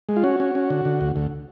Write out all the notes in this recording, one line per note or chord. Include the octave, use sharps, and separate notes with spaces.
G#3
F4
C#4 F#4
C#4
C#4
D3
D3
D2
D2